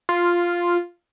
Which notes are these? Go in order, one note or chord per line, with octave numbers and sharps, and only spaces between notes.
F4